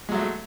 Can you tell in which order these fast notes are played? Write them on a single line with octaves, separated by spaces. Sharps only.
G#3 F#3 A3